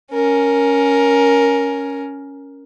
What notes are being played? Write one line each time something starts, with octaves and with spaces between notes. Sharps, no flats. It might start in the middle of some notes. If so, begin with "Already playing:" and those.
C#4 A#4